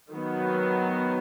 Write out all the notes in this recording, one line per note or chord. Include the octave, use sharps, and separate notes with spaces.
D#3 F#3 B3